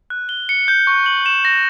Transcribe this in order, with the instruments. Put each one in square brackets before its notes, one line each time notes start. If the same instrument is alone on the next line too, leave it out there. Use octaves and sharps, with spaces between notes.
[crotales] F#6
G7
C#7
G6
C#6
F#7
E7
A#6